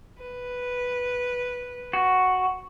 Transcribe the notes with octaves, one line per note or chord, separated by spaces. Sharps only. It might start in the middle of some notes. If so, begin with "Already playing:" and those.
B4
F#4